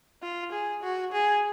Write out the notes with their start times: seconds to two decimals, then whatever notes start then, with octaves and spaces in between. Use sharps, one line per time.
0.22 F4
0.52 G#4
0.83 F#4
1.12 G#4